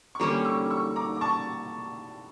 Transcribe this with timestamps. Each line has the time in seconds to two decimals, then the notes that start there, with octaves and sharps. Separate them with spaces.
0.15 C#6
0.20 D3 G3 A#3 C#4 A#5 D6
0.33 D6
0.45 C#6 E6
0.70 C#6 E6
0.96 A#5 D6
1.16 D6
1.21 A5 C#6